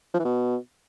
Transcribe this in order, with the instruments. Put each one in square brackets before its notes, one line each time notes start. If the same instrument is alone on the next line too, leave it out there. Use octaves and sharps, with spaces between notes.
[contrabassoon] F3
E3
B2